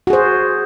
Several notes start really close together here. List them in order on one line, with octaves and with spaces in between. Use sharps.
F#4 G#4 C5